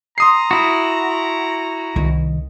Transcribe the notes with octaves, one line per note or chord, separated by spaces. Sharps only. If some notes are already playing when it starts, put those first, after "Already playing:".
A#5 C6 D#6 C7
E4 F#4
C2 D#3